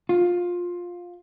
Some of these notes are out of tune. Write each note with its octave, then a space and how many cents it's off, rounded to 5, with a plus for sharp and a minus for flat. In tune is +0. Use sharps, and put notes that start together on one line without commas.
F4 +15